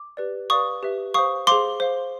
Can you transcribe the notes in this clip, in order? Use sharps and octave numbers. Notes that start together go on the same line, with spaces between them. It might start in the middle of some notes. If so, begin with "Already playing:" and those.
Already playing: D6
G4 B4 D5
B4 D5 F5 C#6 D#6
G4 B4 E5
C5 F5 C#6 D#6
G#4 C5 F5 C6 D6
C5 F5